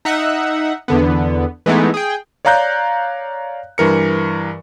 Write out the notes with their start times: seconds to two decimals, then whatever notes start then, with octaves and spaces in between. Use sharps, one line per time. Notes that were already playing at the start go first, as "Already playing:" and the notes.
0.05 D#4 E5 F#5
0.88 E2 D3 B3
1.66 E3 G#3 A3 B3 D#4
1.94 G#4 G5
2.45 C#5 D5 F5 A#5 F#6 G6
3.78 G2 E3 A#4 C#7